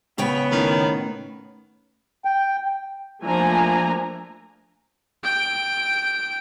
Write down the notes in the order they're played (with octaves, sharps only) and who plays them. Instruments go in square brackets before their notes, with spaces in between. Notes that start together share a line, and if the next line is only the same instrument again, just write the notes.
[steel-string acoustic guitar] C#3 C#5 G5 [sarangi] B3
[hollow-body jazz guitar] A2 C#4 [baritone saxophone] D#3
[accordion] G5
[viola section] F3 A3 A#3 D4 G#5 A#5
[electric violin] G5 D7